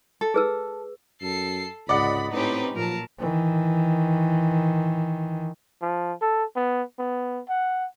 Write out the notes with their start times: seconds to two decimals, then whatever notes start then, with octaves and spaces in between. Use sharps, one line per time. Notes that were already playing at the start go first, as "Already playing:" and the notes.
0.21 A4
0.34 G#4 B4 E6
1.22 F#2 A4 C7
1.89 C#2 G#2 C3 D5 D#5 F#5 B5
2.33 A2 C4 C#4 D#4 G4 B4
2.76 A#2 F3 F#3 A#4 A5
3.19 D#3 E3
5.82 F3
6.21 A4
6.56 B3
6.99 B3
7.49 F#5